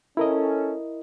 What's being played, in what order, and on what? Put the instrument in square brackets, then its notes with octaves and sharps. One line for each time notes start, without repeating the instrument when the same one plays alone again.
[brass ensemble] C#4 A4 [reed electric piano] E4 A#4 D#5